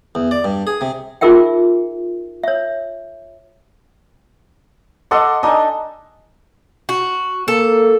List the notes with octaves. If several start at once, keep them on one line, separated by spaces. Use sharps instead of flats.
E2
D5
G2
G#4
C3
D#4 F4 G#4 A#4 E5 G5
C#5 E5
A4 D#5 F#5 C6 D6
D4 D#4 D#5 G#5
F#4
A#3 A4